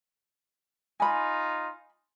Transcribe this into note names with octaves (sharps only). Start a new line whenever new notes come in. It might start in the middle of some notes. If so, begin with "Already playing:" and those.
D#4 F4 G#5 B5